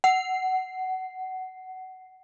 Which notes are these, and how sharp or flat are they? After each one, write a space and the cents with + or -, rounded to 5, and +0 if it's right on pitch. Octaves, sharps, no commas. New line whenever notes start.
F#5 +20